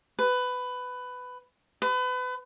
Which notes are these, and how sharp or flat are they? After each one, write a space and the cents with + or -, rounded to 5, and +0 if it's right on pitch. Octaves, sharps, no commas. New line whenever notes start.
B4 +15
B4 +30